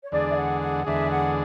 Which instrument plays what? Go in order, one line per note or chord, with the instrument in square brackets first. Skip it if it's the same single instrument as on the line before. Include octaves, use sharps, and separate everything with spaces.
[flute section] C#5
[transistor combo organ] E2 D3 G#3 D4 G#4 [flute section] D5
[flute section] E5
F#5
F#5
[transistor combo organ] E2 D3 G#3 D4 G#4 [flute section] E5
[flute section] G#5
F#5